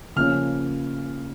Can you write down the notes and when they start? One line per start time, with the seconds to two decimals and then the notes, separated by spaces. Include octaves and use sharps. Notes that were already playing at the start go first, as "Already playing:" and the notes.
0.16 C#3 F3 A#3 C#4 F6